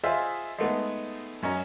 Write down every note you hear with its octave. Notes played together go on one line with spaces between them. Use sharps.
F4 G#4 C5 D#5 E5
G#3 A3 B3 D#4
F#2 C#4 D#5 A#5